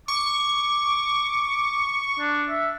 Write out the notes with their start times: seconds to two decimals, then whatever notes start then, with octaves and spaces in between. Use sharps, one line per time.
0.08 C#6 D6
2.19 D4
2.49 E5